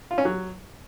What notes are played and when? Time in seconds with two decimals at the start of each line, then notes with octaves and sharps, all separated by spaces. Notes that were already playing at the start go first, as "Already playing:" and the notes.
0.11 F4
0.18 C#4
0.25 F#3